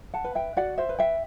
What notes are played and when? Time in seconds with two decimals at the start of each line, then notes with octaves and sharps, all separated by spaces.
0.14 F#5 A5
0.24 B4
0.35 E5 G5
0.57 F#4 D5 F#5
0.78 C5 E5
0.89 B4
0.99 E5 G5